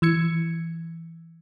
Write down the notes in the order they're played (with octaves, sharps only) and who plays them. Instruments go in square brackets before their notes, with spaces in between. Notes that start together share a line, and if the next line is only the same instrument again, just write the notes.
[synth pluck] E3 E6 G#6 C#7